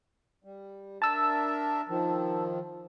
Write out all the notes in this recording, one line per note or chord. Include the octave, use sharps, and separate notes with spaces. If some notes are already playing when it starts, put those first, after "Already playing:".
G3
D4 A#4 E5 A5 E6
D#3 F3